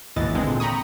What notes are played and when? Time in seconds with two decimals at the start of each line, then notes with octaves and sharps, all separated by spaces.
0.16 G#1 D#2 E3 D#5 A6
0.34 D3 G#3 C4
0.47 A#2
0.60 G5 A#5 B5 C#6 D#6